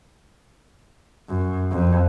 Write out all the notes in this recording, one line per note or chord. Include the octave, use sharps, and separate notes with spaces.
F#2
F2